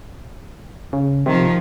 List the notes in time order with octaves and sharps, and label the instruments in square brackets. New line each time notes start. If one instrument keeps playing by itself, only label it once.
[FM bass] C#3
[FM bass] C3 [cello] D#3 F3